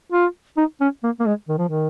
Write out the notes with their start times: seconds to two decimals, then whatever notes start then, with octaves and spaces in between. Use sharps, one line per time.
0.12 F4
0.57 D#4
0.81 C#4
1.04 A#3
1.20 A#3
1.26 G#3
1.48 D#3
1.58 F3
1.68 D#3